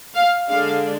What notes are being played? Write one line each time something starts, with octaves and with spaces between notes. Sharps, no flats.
F5
D3 G#3 D4 F5